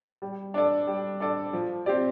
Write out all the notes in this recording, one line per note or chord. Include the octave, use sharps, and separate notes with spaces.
G3
D4 A4 D5
G3
D4 A4 D5
F3
C4 G4 D5